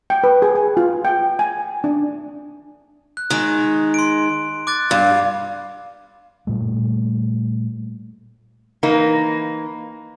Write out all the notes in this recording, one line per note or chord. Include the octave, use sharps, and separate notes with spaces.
G5
B4
G#4
G#5
F4
G5
G#5
D4
F#6
D#3 G#3
C6 D7
D6 F#6 A6
G2 F5
A#2 G3 A3
E3 A#3 D#4